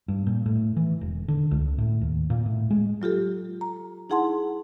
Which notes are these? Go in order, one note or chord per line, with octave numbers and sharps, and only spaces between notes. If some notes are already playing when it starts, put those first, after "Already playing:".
G2
A#2
A2
E3
E1
D3
C#2
A2
D#2
A#2
A2
G#3
F#3 F4 G4 A4
A#5
D#4 E4 G#4 F#5 A5 C6